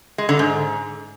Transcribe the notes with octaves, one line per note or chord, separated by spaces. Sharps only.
G#3
D3
G#2